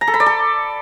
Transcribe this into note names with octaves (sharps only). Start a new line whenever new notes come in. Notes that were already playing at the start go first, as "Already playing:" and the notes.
A#5
A4
B5
D5
A4